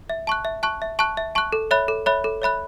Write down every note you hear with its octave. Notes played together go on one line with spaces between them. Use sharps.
E5
A5 C#6 F#6
E5
A5 C#6 F#6
E5
A5 C#6 F#6
E5
A5 C#6 F#6
A4
C#5 E5 B5 F#6
A4
C#5 E5 B5 F#6
A4
C#5 E5 B5 F#6